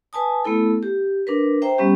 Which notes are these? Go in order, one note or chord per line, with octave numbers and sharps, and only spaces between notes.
B4 G#5 A5 D#6
A3 B3 E4 A4
G4
D4 A#4 B4
C5 E5 G5 A#5
G3 B3 C#4 G4